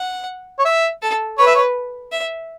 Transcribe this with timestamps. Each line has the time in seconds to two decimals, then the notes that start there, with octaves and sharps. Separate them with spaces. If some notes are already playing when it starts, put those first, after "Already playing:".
Already playing: F#5
0.59 C#5
0.65 E5
1.02 A4
1.38 B4 C#5
1.47 E5
1.55 C#5
2.12 E5